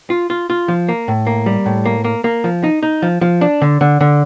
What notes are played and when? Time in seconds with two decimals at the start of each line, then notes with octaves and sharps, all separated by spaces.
0.10 F4
0.30 F4
0.50 F4
0.68 F3
0.89 A#3
1.08 A2
1.27 A#3
1.46 G3
1.66 A2
1.86 A#3
2.05 A#3
2.24 A#3
2.44 F3
2.64 D#4
2.83 D#4
3.02 F3
3.21 F3
3.41 D4
3.62 D3
3.81 D3
4.01 D3